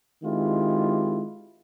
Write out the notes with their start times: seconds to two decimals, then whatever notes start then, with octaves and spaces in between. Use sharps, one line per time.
0.23 D#3 G#3 C4 E4 F4 G4